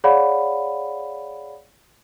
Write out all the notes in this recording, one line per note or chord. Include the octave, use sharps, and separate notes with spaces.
G#4 C#5 D5 F5 F#5 B5